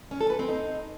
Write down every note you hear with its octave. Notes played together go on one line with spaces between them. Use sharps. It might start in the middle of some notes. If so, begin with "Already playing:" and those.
C#4
A4
B4
C4
D#4